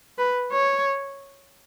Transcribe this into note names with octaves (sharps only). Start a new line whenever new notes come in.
B4
C#5